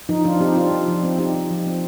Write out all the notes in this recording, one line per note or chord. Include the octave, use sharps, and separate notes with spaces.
F3 D#4
F3 D4 F4
C4 D#4 G4
C4 D4 F4
F3
F3
C4
C4 D#4 G4
F3
F3
C4